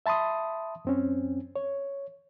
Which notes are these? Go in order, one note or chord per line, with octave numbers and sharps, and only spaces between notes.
E5 A5 B5 C6 D#6
F#2 C4 C#4
C#5